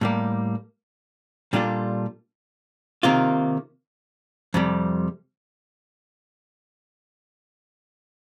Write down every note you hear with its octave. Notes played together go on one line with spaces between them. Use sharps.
A2 G3 A#3
A#2 G3 D4 F4 A4
C3 D#3 A#3 F4
F2 C3 G3